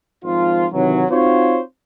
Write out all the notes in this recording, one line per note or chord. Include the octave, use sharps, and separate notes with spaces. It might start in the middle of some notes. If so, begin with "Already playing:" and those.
G#1 F3 F4
C3 D#3 E3 F#3
C4 D#4 F4 F#4 C5 C#5